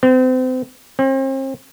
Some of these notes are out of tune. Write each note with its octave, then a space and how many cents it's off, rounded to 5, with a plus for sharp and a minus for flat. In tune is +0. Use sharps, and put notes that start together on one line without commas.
C4 -35
C4 +40